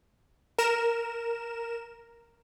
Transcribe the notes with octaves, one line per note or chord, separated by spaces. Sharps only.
A#4 E7